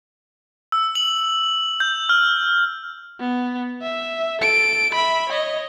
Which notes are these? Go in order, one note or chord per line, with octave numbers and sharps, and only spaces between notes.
E6
F#7
G6
F6
B3
E5
A4 D7
E5 B5
C#5 D#5